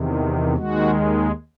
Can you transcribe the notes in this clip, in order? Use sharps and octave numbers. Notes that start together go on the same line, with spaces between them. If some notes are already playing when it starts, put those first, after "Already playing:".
Already playing: E2 C3 D#3
D#2 D#3 G#3 F#4